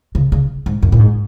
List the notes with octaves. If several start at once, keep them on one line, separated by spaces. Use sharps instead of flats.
C#3
C#3
G#2
F#2
A#2
G#2